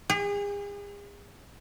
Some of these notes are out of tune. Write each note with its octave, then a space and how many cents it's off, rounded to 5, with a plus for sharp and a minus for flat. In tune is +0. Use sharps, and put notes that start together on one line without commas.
G#4 -40